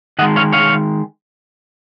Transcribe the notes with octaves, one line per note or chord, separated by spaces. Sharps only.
D#3 G#3 D#5 F#5
C#5 F5
C#5 F5